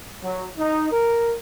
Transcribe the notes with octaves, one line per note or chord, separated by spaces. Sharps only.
F#3
D#4
A#4